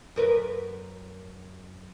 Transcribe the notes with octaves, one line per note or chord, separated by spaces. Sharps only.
F#2 A#4 B4